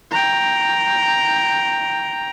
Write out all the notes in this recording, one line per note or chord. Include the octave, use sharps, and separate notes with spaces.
G5 A#5